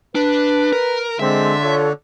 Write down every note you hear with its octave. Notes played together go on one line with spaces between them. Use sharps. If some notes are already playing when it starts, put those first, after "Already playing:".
D4 B4
A#4
D3 G#3 C4 E5 C6
F4 A4 C#5